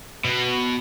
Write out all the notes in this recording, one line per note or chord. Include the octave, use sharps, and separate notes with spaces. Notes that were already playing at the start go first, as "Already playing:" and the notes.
B2